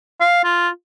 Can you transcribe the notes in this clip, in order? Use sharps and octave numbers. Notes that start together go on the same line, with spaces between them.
F5
F4